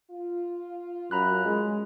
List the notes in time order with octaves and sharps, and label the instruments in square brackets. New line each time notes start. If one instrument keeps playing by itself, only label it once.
[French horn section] F4
[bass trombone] F#2 [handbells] A#5 B5 F#6
[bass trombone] G#3